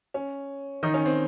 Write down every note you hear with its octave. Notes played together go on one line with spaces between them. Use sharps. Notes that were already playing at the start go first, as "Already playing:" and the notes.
C#4
D#3 D#4
C#4
C4